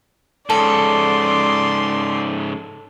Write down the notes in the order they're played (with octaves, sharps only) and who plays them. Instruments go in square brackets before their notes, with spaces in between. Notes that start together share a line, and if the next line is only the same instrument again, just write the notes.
[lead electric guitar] G#2 C#3 [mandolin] A4 [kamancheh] D5 C6